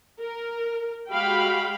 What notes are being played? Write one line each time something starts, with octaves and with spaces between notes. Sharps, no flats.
A#4
G#3 F#4 G4 F5 G5 B5